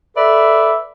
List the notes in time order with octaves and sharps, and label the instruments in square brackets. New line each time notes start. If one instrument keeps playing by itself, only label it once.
[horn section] A4 B4 D5 E5